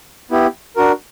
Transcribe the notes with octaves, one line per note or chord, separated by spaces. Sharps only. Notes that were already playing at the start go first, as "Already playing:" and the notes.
B3 E4 G4
D4 F#4 A#4